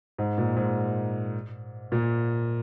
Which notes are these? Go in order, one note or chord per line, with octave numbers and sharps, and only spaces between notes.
G#2
A#2
G#2
A#2